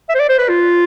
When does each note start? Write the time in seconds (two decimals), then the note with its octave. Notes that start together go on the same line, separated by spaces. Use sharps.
0.09 E5
0.15 C5
0.19 D5
0.29 C5
0.39 B4
0.49 F4